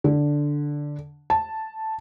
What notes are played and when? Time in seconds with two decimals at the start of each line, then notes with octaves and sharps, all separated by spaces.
0.04 D3
1.30 A5